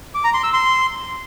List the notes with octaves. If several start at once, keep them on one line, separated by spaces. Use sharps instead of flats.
D6
A#5
C6
E6
C6